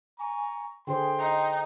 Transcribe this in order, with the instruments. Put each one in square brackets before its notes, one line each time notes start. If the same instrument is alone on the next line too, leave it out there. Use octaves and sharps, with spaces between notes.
[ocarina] G#5 [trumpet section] A#5 C#6
[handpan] D3 G#4 C5 [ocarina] G5 [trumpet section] C6
[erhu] D#4